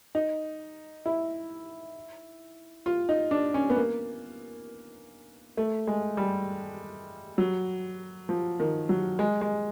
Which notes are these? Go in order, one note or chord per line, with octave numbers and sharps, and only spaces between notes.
D#4
E4
F4
D#4
D4
C#4
B3
A#3
A3
G#3
G3
F#3
F3
D#3
F#3
G#3
G#3